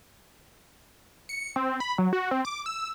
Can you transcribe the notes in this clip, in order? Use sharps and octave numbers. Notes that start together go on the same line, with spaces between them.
C#7
C4
B5
F#3
F#4
C4
D6
E6